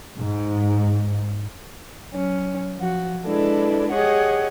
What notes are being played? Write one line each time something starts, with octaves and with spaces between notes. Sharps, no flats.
G#2
F#3 C#4
F3 F#4
G#3 D4 E4 A4 B4 D5
G4 G#4 C#5 D#5 F#5